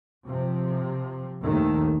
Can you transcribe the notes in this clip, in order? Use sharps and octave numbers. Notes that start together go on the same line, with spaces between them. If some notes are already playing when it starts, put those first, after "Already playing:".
C3 F3
A#1 D#2 D#3 A3